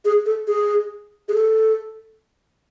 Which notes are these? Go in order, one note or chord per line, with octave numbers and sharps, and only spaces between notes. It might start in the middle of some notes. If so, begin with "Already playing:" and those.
G#4
A4
G#4
G#4
A4